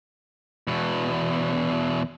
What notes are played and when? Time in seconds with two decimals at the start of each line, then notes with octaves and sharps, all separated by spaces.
0.67 E2 B2